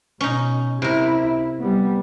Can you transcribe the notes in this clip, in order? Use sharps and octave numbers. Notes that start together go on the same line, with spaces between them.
B2 C#4 D#4
C3 E4 A#4
G3 B3